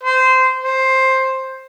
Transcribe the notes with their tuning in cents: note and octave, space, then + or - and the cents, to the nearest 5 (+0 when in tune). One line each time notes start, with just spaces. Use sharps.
C5 -15
C5 +10